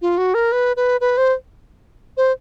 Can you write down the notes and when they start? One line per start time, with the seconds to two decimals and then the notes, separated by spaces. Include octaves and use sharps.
0.02 F4
0.18 F#4
0.34 A#4
0.52 B4
0.76 B4
1.01 B4
1.17 C5
2.17 C5